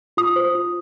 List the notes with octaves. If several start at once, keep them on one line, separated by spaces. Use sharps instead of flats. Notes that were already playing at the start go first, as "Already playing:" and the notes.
F4 D#6
C5
F4